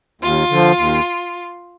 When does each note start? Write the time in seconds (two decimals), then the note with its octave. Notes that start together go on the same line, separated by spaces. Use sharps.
0.22 D#2 F4
0.50 D3 F3
0.78 D#2